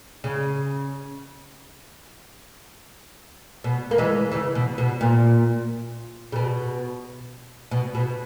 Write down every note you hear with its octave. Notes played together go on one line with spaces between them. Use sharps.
C#3
B2
A#3
E3 G#3
C#3 E3
B2
B2
A#2
C#3
B2
B2
B2